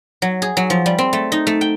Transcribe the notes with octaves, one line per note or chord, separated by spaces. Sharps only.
F#3
G#4
F#3
F3
G3
C4
A3
D#4
A3
G5